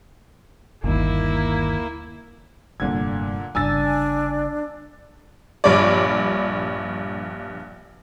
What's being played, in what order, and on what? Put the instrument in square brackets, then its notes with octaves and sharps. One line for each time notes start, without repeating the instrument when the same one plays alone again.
[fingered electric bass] G1 D#2 [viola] A#3 E4
[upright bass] F1 G2 [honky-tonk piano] A#2 D3 G#6
[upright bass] G1 C#3 [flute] D4 [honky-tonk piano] G#5 E6 A6
[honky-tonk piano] A#1 G2 C#5 D5